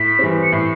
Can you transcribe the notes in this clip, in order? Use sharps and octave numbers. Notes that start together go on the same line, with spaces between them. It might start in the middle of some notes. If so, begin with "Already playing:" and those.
Already playing: A2 B6
E3 G3 C4
C#7
A2 C7